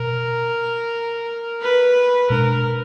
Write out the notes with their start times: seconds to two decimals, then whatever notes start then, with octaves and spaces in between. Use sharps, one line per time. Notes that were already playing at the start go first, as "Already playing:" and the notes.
Already playing: B2 A#4
1.62 B4
2.30 B2 G#3 D4 A#4